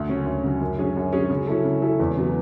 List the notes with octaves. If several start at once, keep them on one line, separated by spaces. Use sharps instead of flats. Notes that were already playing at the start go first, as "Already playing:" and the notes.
Already playing: D2
C#3 F#3 C#4
D2
C#3 F#3 C#4
F#2
D3 F#3 C#4 G#4
F#2
D3 F#3 C#4 G#4
C#3
F#3 C#4 E4 A4
C#3
F#3 C#4 E4 A4
E2
C#3 F#3 B3